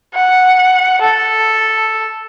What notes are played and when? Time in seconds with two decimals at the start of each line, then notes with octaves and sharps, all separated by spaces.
0.15 F#5
1.02 A4